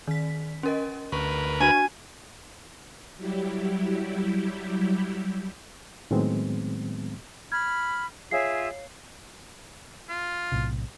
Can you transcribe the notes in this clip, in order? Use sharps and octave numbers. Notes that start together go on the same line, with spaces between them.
D#3 B6
C#4 A#4 D#5
D2 A#4 B4 C#6
D4 F#4 G#5
F#3 G3 E4 G4
A2 D#3 F#3 G#3 B3 C4
B5 F6 G#6
F4 G#4 C#5 E5 F5 C7
F4
B1 A2 C3